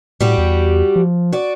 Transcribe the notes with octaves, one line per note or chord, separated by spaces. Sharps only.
A2 G3 F#4 G4
E2
F3
F#4 D5